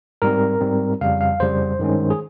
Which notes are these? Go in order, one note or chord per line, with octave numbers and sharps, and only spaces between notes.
G#2 G3 C4 A#4
G#2 G3 C4
F2 C#3 G3 F5
F5
F2 C#3 G3 C5
G2 D#3 G#3 C#4
G#4